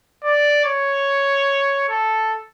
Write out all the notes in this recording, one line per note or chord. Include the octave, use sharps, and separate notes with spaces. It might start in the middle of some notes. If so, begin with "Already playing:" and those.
D5
C#5
A4